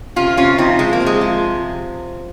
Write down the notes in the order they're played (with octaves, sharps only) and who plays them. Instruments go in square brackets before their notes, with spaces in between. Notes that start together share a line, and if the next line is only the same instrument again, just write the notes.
[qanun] C3 [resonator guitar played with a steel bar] C#4 F4
[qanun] C3 [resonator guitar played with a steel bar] C#4 F4
[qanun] F3 [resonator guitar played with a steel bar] C4 D#4
[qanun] F3 [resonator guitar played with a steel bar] G#3
[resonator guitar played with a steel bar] A#3
[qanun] C3
[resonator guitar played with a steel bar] G#3
[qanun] F3